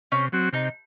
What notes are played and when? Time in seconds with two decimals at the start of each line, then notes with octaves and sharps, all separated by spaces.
0.12 C3 C#4
0.32 F#3 C4 F#4
0.53 C3 D#4